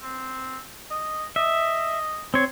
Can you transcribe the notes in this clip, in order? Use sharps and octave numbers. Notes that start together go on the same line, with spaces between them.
C4
D#5
D#5 E5
C4 C#5 C6